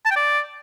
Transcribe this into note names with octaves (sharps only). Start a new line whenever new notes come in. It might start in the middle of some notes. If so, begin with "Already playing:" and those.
A5
G5
D5